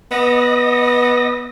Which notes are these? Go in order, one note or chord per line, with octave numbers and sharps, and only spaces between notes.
B3 D#5 A#6